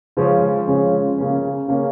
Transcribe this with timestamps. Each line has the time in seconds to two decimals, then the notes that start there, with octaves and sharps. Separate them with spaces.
0.17 C#3 F3 G#3 C#4
0.67 C#3 F3 G#3 C#4
1.18 C#3 A#3 C#4
1.68 C#3 A#3 C#4